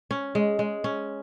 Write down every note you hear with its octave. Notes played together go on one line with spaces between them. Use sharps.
C#4
G#3
G#3
C#4